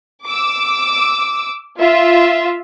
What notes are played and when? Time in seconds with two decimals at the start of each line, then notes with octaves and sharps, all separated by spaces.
0.24 D6 E6
1.79 F4 E5